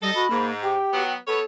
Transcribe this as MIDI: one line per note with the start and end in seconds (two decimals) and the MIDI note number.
0.02 0.11 55
0.02 0.24 69
0.02 0.24 75
0.15 0.27 66
0.15 0.46 83
0.30 0.76 44
0.30 0.51 58
0.63 1.02 67
0.63 1.14 79
0.93 1.15 54
0.93 1.15 59
1.27 1.41 59
1.27 1.44 69
1.27 1.41 73